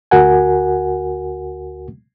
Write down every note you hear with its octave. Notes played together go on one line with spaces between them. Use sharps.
D2 F#4 A#4 F#5 G#5